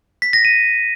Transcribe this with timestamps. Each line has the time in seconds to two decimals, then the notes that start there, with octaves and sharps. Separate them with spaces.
0.22 B6
0.33 A#6
0.45 D#7